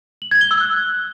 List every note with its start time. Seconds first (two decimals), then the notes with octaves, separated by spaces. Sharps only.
0.22 F#7
0.31 G#6
0.41 G7
0.51 E6
0.60 F#6